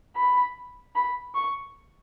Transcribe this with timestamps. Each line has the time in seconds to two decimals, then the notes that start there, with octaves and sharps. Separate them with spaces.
0.17 B5
0.96 B5
1.35 C#6